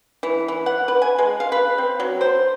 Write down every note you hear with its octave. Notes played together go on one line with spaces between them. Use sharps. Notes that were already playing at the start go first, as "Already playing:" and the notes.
E3
E3
F#5
B4
G#5
G#3
F5
B4
C4
F#3
C5